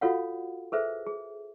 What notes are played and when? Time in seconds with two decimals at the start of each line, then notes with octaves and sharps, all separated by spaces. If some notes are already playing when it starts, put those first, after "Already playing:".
0.01 F4 F#4 A4 C#5 F5 F#5
0.72 G#4 A4 B4 C5 E5
1.07 G#4